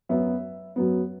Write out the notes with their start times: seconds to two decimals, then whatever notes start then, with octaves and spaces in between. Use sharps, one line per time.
0.09 F#2 F#3 B3 E5
0.76 F#2 F#3 B3